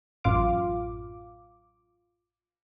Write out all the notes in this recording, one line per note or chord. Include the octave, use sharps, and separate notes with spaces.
A1 F#2 F4 F5 D6